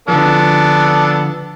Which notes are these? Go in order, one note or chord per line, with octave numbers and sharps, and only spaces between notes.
D3 F3 B3 D4 A4